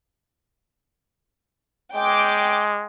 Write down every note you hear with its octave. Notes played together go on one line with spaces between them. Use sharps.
G#3 G5 D6